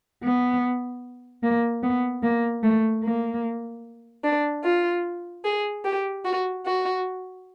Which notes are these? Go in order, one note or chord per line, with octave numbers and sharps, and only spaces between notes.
B3
A#3
B3
A#3
A3
A#3
D4
F4
G#4
G4
F#4
F#4